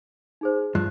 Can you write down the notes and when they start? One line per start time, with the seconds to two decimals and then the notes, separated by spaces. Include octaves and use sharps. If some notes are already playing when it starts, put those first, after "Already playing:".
0.41 D#4 G#4 C5
0.75 G2 F3 F#6